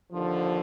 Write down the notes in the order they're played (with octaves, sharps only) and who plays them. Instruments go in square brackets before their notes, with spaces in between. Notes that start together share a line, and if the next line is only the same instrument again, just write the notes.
[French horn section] D#2 D3 F3